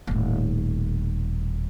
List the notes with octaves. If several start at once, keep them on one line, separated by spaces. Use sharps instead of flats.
D#1 A2